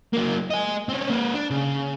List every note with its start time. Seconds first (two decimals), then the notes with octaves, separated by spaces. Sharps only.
0.13 F#3 A#3
0.51 D#5 G#5
0.89 C4 C#4
1.10 A#3 B4
1.34 D4
1.51 C#3